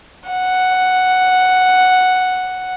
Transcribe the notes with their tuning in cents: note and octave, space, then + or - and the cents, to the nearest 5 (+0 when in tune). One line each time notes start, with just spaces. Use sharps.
F#5 +0